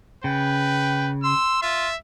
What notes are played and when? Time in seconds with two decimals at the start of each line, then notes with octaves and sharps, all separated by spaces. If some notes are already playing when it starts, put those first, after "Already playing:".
0.24 C#3 B4 G5
1.24 C6 E6
1.62 F4 E5